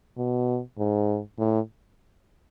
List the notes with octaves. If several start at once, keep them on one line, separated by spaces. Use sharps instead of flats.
B2
G#2
A2